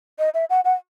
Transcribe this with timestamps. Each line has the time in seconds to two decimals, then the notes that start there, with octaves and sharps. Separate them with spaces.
0.19 D#5
0.34 E5
0.50 F#5
0.65 F#5